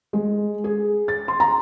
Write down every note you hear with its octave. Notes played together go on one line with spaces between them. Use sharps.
G#3
G#4
A6
C6
A#5